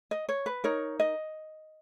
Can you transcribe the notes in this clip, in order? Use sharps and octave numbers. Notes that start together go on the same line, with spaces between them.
D#5
C#5
B4
D#4 A#4 C#5
D#5